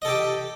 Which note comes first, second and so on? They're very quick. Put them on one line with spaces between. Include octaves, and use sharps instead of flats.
D#5 A4 G4